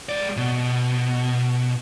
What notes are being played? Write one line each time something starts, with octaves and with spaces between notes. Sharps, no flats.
G#3 D5
B2